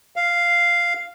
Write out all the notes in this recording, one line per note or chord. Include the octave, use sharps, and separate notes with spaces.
F5